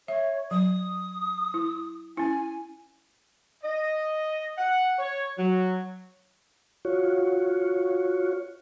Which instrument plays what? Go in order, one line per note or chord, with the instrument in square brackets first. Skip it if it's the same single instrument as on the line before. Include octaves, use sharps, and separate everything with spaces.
[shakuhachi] C#5 [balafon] E5
[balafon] F#3 [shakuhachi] D#6
[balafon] E4
[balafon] C#4 E4 [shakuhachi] G#5
[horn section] D#5
F#5
C#5
F#3
[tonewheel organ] F4 F#4 C#5